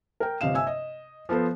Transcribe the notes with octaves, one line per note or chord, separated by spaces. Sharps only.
A#4 G5
G1 C3 D#5 F5 E7
E5 G#5 E6
D#5
F3 B3 A4 C5